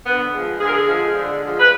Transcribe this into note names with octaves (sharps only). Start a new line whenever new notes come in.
D3 B3
F3 G#3
D3 G#4
A#4
G#4
F3 G#3
D3
F3 G#3
B4